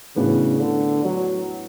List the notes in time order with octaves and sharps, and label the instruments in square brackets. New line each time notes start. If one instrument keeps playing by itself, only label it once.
[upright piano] A2 E3 B3 D4 F#4 [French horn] C#3
[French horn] D3
F#3